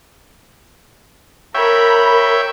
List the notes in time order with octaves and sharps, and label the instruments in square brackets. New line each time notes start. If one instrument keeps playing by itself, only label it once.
[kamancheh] A#4 B5 [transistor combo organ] C#5 E5 G5